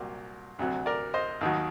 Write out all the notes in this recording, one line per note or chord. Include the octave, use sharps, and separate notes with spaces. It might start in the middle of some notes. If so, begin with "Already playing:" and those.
Already playing: C2 A#2 F#3 G4 A#4
D2 C3 F#3
A#4 D5
C5 D#5
D#2 D#3 F#3